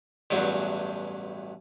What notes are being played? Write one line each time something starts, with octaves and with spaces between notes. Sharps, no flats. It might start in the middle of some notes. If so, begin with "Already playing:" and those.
A1 E2 G2 F#3